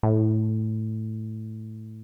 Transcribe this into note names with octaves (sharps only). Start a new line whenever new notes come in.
A2